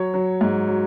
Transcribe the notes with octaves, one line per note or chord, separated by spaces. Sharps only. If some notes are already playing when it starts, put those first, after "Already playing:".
Already playing: F#3 C#5
F#3
G#2
F#3